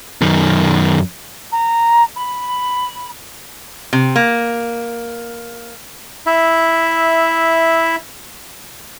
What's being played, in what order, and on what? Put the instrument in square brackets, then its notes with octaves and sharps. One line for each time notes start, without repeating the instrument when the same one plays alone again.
[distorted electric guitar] F#2 D#3
[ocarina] A#5
B5
[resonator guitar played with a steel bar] C3
A#3
[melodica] E4 E5